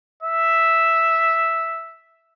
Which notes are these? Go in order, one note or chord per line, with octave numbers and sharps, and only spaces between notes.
E5